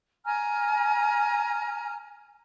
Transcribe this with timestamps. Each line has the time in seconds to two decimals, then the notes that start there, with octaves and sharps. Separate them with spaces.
0.25 G#5 A#5 F6